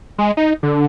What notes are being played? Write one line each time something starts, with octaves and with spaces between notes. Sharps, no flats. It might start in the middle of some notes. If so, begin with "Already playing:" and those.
G#3
D#4
D3